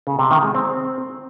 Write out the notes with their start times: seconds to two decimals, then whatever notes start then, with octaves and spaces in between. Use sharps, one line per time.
0.07 C#3
0.19 C3
0.31 D#3
0.43 G#3
0.55 C4